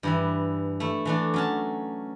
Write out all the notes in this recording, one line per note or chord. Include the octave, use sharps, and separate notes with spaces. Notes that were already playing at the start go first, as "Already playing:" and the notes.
G2 E3 E4
A3 E4
E3 A3 D4
F#3 C#4 A5